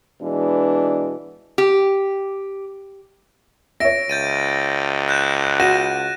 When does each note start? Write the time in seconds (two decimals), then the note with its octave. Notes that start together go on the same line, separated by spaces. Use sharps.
0.22 B2 E3 G#3 D4
1.58 G4
3.80 C#5 E5 A#6 D7
4.09 C#2 G6 A6 D#7
5.08 F#6 G6 E7
5.60 F#4 A#6 D#7 E7